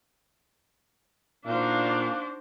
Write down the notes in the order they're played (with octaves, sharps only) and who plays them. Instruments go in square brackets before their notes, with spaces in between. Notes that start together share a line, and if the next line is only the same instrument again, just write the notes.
[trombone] A#2 [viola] D4 [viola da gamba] D#4 F#4 C5 [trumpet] F5